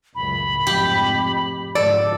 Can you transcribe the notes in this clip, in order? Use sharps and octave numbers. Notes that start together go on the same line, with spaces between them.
C#2 F#2 A2 B5
F1 F2 G#2 G4
G#2 D3 F3 A4 D5